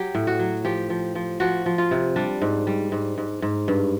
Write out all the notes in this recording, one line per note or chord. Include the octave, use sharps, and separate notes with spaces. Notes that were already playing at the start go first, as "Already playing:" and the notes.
Already playing: F#3 G4
A2
F#4
F#3
F3 G4
F3
F3
F3 F#4
F3
F4
C3
G3 D4
G#2
G3
G#2
G#2
G#2
G2